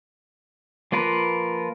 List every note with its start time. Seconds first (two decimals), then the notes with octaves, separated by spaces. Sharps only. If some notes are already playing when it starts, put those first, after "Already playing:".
0.92 F3 A#3 F4 A#4 B4